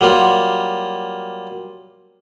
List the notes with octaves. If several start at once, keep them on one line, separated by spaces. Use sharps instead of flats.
F#3 G3 A#3 F4